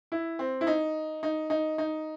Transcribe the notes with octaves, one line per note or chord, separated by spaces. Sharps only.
E4
C4
E4
D#4
D#4
D#4
D#4